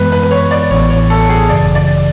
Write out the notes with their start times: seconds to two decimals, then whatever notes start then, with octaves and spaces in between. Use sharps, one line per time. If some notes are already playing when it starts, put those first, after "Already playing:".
Already playing: F#2 E3 G#3 B3 B4
0.12 B4
0.23 B4
0.31 C#5
0.51 D5
0.70 A1 A2 E3 B3 C#5
0.90 C#5
1.10 A4
1.29 G#4
1.49 G#1 F#2 C#3 E3 D5
1.75 D5